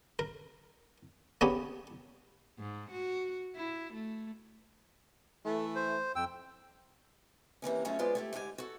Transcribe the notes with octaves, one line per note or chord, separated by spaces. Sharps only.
A#4
A#3 B3 C#4 D4 G4 G#4
G#2
F#4
E4
A3
E3 A3
C5
F2 G5 E6
C3 E3 A#3 C#4
F#3 A3 C#4 F4 G#4
F#3 G#3 B3 F4 C5 D5
A3 E4 G4
G#2 D3 G4 A4 G#5
F#4 A4